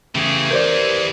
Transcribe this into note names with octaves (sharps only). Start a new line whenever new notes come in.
C#3 E3 A3 G4 G#4
G4 A#4 C5 D5 G6